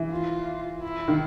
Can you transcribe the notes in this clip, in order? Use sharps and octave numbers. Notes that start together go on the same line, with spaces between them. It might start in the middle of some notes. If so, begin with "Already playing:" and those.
Already playing: E3
F4
E4
D#3